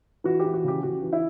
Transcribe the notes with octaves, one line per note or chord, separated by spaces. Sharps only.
E3 F#4
E3 G4
F#4
C#3 G4
C#3 F#4
E3
E4